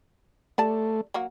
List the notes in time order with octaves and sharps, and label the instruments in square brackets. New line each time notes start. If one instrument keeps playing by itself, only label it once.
[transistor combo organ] A3 [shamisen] G4 D5 A5
[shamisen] F#3 A#3 F#4